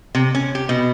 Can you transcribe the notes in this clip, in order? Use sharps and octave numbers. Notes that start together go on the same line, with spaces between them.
C3
C#4
G4
B2